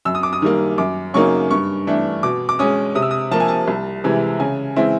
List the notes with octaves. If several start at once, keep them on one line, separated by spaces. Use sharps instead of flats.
F#2 E6
D#6
D6
D#6
D#3 G3 A#3
F#2 D6
C#3 F#3 A#3 D#4 C#6
G2 C#6
E3 A3 D4
B2 D6
D6
G#3 C#4 D#6
C3 D#6
E6
D#6
F3 A#3 A5
G#5
A5
C2
C3 E3 G#3
C#3 G#5
E3 G#3 C4 E4